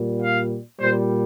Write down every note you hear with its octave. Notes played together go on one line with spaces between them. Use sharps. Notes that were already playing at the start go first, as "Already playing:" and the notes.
Already playing: A#2 G3
F5
A#2 G3 C5